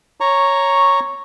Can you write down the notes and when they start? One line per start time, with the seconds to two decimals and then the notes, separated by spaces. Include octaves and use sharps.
0.20 C#5 A#5 C#6